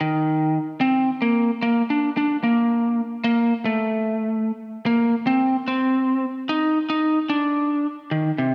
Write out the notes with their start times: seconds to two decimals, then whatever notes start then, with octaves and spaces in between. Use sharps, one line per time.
0.01 D#3
0.81 C4
1.22 A#3
1.62 A#3
1.90 D4
2.17 D4
2.43 A#3
3.24 A#3
3.65 A3
4.86 A#3
5.27 C4
5.68 C4
6.49 D#4
6.90 D#4
7.30 D4
8.11 D#3
8.38 C3